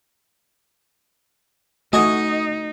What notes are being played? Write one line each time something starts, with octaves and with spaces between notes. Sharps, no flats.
A3 D#4 F#4 D#5 G#5 C#6 D#6